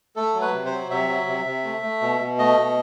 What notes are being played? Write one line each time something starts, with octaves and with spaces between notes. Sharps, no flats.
A3 A4
F#3
B4
C3
C5
F#3
C3 E5
F#3
C3
C3
A3
A3
B2
B2
A3 D#5
B2